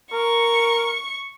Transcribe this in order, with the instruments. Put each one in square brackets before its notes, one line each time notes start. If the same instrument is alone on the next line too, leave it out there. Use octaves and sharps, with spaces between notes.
[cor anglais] A#4 [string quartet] C#6